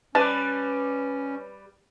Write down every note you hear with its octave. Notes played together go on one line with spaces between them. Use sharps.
G3 C#4 G4 B4 A5